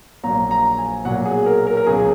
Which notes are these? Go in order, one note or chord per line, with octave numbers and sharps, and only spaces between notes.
A#1 A#2 F#3 A#5
A#5
G#5
B1 A#2 F#3 F#5
G#4
A#4
A#4
A#4
C#2 B2 F#3 G#4